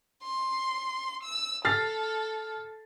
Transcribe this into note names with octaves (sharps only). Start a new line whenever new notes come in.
C6
E6
A4 F6 A6 C7